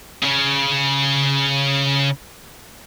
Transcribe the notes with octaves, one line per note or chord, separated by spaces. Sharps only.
C#3 C#4